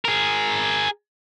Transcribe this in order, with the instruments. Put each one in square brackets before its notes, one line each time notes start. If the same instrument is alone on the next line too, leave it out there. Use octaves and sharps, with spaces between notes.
[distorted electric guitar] G#4 A#4